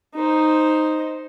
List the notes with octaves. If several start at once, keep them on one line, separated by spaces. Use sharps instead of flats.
D#4 C5